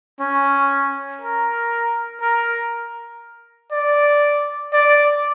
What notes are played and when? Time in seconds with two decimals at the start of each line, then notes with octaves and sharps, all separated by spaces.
0.21 C#4
1.22 A#4
2.21 A#4
3.72 D5
4.73 D5